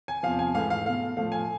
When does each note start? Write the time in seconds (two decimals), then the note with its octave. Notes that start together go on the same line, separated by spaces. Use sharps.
0.08 G#5
0.23 E2 C3 F3 F5
0.39 G#5
0.54 G#2 E3 A3 F5
0.70 F5
0.85 B2 A3 F5
1.17 A2 F3 A3 F5
1.32 G#5